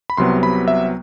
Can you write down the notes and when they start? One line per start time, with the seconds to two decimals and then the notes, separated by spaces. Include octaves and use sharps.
0.10 B5
0.17 C2 C3 F#3 B3 C6
0.43 B5
0.68 E5